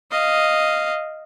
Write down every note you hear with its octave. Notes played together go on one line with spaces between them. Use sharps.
D#5 F5